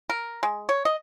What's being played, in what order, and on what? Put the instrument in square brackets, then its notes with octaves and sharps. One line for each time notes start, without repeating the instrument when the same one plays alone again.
[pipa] A#4
G#3
C#5
D#5